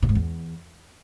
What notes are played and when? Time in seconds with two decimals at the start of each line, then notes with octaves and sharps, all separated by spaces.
0.02 B2
0.09 G#2
0.15 E2